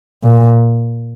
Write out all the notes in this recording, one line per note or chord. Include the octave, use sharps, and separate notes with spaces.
A#2